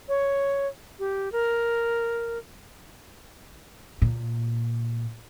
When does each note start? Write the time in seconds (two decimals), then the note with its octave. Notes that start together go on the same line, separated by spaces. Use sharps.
0.09 C#5
0.99 G4
1.32 A#4
4.02 A#2